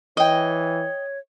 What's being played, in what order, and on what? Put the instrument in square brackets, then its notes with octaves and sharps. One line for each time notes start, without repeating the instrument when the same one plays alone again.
[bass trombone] E3 [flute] C#5 [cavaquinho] D#5 G5